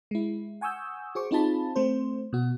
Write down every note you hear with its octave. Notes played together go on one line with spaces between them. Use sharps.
G#3 E4
F#5 G#5 C#6 D#6 E6 G6
F#4 G#4 C5 C#6 D6
C4 D#4 F4 G#4 A5 B5
A3 C4 C5
B2 F#4